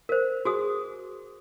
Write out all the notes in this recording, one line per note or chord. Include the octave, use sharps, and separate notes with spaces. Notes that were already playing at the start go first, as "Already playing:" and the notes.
A#4 C5
F#4 G#4 D#6